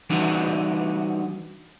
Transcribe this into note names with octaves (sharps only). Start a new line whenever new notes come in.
E3 G3 D4 D#4 F#4